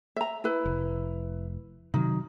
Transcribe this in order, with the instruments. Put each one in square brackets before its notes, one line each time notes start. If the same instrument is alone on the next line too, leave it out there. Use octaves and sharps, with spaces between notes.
[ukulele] E5 A#5
E4 B4
[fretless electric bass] F1
[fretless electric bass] C3 D#3 F#3 [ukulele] D#4